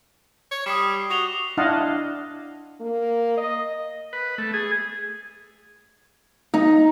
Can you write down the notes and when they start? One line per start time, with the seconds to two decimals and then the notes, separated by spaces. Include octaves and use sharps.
0.51 C#5
0.66 G3 D#6 C7 E7
1.10 F#4 F#6 F7 G7
1.57 D4 E4 D#5 F5 F#5 A5
2.80 A#3
3.37 D#5
4.13 B4
4.38 A3
4.54 G#4
6.54 D#4